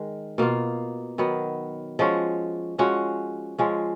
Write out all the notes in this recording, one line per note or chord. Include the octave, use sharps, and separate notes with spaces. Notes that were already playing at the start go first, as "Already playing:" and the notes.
Already playing: D#3 G#3
B2 A#3 F4
D#3 F#3 B3
F3 G#3 C#4 F#4
F3 G#3 C#4 F#4
F3 G#3 C#4